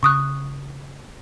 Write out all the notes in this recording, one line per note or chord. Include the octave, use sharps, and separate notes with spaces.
C#3 C#6 D#6 F#6